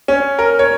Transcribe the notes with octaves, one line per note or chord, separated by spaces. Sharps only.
C#4
A#4
C#5